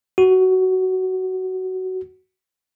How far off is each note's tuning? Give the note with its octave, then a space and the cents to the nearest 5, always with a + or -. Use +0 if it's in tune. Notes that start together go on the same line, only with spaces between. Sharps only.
F#4 +15